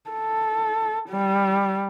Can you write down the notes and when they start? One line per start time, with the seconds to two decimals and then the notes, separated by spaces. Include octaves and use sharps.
0.10 A4
1.09 G3